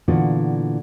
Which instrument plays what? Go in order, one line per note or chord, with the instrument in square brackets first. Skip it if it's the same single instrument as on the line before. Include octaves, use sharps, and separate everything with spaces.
[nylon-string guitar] A#2 D3 E3 B3 F4 F#4